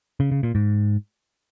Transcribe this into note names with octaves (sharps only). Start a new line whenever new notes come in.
C#3
C#3
A#2
G#2